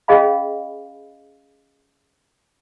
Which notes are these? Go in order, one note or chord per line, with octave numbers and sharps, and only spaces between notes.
C#4 G#4 D#5 F5 B5